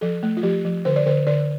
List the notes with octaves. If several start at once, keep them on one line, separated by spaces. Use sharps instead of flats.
F3 A4
A3
F4
F3 G4
F3
D3 C5
D5
D3 C5
D3 D5